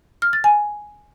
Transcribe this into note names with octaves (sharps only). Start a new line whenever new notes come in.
F6
A6
G#5